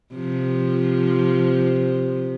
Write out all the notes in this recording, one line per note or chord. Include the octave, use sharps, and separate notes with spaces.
C3 F3